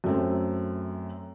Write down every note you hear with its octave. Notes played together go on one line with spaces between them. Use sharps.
F#2 A3 C4